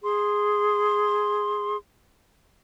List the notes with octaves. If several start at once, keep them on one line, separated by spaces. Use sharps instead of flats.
G#4 C6